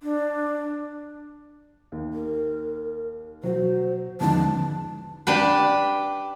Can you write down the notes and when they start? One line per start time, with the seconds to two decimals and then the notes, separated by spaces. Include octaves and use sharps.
0.03 D4
1.92 D#2
2.13 A#4
3.43 B2 F#3 F#4 C5
4.20 E2 G#2 D3 D#3 F3 C#4 A5
5.27 D4 G4 B4